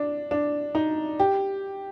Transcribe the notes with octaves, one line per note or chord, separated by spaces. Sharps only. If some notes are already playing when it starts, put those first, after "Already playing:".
Already playing: D4
D4
D#4
G4